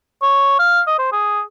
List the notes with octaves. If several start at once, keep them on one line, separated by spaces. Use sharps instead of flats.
C#5
F5
D#5
C5
G#4